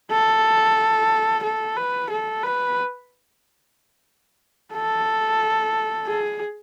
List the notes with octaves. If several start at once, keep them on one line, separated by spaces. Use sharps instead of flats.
A4
A4
B4
A4
B4
A4
G#4